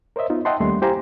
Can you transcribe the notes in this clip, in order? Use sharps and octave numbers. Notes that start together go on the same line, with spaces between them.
A#4 C5 C#5 D#5 E5
B3 D#4 F4
D#5 E5 F#5 G5 A5 C6
D#2 G3 A3 A#3 C#4 C6
E4 G4 C5 F5 G#5 A#5